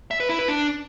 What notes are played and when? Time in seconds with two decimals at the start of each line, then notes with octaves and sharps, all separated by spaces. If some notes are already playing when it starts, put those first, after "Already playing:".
0.11 E5
0.20 B4
0.29 E4
0.39 B4
0.48 D4